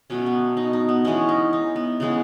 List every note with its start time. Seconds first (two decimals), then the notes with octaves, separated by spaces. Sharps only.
0.10 B2 F#3 A3 C#4
0.26 B3
0.57 D#4
0.73 D#4
0.88 B3
1.05 E3 G#3 B3 C#4
1.28 D#4
1.53 D#4
1.76 B3
2.00 C#3 E3 G#3 B3